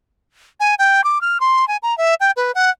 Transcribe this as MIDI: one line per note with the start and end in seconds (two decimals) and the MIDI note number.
0.60 0.75 80
0.79 1.04 79
1.04 1.21 86
1.21 1.38 89
1.40 1.67 84
1.68 1.77 80
1.83 1.97 82
1.98 2.15 76
2.20 2.31 79
2.36 2.52 71
2.55 2.70 78